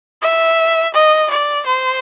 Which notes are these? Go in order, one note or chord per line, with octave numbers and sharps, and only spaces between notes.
E5
D#5
D5
C5